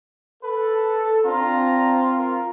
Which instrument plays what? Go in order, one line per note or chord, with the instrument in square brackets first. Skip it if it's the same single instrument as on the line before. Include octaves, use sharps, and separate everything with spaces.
[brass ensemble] A4 [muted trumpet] B4
[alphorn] C4 [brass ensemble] D4 A#5 [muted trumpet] F4
[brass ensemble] F4 [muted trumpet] A#4